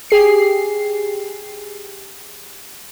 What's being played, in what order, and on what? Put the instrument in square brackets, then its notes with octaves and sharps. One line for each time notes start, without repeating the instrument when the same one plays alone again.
[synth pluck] G4 G#4 C7